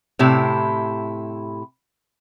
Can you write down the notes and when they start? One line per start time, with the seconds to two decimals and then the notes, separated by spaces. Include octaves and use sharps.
0.19 A2 C3 E4 G4